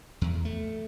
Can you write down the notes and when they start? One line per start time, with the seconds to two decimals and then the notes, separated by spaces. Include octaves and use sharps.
0.21 E2
0.45 A3